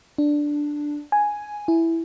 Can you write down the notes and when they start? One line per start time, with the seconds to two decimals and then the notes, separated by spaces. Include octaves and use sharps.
0.18 D4
1.12 G#5
1.68 E4